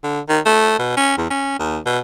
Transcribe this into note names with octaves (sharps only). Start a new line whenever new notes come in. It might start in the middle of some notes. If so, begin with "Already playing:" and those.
D3
D#3
A3
B2
C#4
E2
C#4
D#2
B2